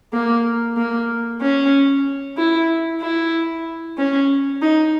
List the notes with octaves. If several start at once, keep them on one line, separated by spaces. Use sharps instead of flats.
A#3
A#3
C#4
E4
E4
C#4
D#4